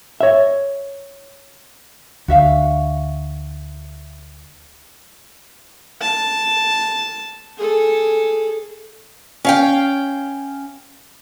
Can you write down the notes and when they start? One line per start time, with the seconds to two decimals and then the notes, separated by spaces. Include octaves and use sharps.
0.21 C#5 E5
2.28 D2 F#4 E5 F5
6.01 A5
7.58 G#4 A4
9.45 C#4 F5 G5